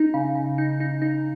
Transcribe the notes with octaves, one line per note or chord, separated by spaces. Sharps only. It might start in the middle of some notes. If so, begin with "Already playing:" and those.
Already playing: D#4
C#3
C#3
D#4
D#4
D#4